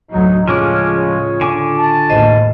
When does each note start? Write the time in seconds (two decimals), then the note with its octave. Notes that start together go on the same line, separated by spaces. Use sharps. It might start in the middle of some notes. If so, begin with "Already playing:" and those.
0.11 D2 A2 F#3 D#4
0.48 A2 C#3 F3 G#3 C#4 F4 C#6 D6
0.97 C#5
1.41 D3 G#5 D6
1.78 A5
2.10 A1 D#2 A2 C5 D#5